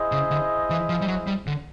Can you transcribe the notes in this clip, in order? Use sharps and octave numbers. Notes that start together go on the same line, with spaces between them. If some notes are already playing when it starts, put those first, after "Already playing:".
Already playing: E4 G#4 C5 D#5
C#3
D3
E3
F3
G3
F#3
G3
D3